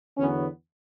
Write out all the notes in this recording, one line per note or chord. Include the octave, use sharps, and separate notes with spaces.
E2 D3 F#3 B3 C#4